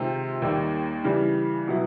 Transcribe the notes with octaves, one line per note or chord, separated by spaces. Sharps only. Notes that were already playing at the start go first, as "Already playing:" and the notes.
Already playing: C3 D#3 G#3 C4 F4
D#2 D#3 G3 A#3 D#4
C#3 E3 G3
B2 F#3 B3 E4